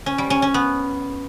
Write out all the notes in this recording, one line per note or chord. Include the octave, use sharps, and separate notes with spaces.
C#4
G3
C#4
C#4
B3